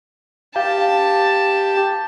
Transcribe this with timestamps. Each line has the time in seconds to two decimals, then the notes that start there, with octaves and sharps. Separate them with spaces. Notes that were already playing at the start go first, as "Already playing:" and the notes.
0.56 G4 F5 A5